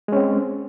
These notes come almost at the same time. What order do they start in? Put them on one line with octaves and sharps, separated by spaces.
G#3 C#4 C4